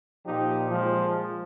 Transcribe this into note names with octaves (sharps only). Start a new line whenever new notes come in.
A#2 F3 D#4 G4
F3 G#3